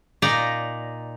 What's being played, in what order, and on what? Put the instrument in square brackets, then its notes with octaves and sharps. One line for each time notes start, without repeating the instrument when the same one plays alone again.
[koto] A#2 D#4 D5 A#5